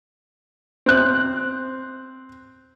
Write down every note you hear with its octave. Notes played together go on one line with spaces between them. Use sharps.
C4 F#6